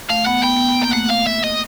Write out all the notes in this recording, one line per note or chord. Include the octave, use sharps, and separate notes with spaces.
A3 F5
B3 F#5
B3 G5
B3
B3
A#3 G5
A3 F#5
F5
E5
D#5